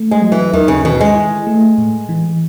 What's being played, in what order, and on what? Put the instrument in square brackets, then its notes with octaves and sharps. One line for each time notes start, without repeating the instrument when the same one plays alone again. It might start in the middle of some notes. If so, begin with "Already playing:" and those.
Already playing: [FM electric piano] A3
[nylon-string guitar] G#3
[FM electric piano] F#3
[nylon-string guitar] E3
[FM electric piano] D#2 [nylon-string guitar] D#3
[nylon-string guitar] C#3
[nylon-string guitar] B2 [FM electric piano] D#3
[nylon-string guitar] G#3
[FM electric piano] E4
A3
A2
E3